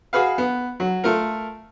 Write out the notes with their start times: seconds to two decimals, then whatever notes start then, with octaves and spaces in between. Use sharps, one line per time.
0.13 F#4 G#4 B4 F5
0.38 B3
0.80 F#3
1.04 A3 F4 A#4